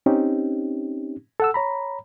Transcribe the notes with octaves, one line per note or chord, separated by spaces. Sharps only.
C4 C#4 D#4 G4
A4 F#5 E6
C#5 A#5 B5